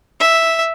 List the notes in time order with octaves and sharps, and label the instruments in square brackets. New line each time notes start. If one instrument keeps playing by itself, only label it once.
[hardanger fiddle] E5